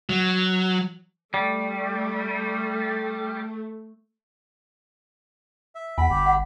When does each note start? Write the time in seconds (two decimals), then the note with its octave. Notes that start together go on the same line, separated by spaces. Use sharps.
0.09 F#3
1.34 G3 A3
5.75 E5
5.98 E2 F#5 G#5 B5
6.10 G1 G4
6.26 F#5